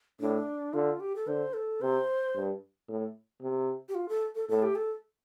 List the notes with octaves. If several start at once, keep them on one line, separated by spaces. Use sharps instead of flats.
A2 D4
D3 F4
G4
A4
D3 C5
A4
C3 C5
G2
A2
C3
G4
F4
A4
A4
A2 A4
G4
A4